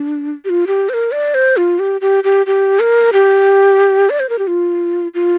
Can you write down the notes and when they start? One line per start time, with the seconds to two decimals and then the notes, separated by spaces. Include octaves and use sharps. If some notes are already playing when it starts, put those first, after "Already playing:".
Already playing: D4
0.45 G4
0.50 F4
0.67 G4
0.89 C5
0.94 A#4
1.12 D5
1.34 C5
1.57 F4
1.79 G4
2.01 G4
2.24 G4
2.46 G4
2.80 A#4
3.13 G4
4.10 D5
4.20 C5
4.29 A#4
4.39 G4
4.47 F4
5.15 F4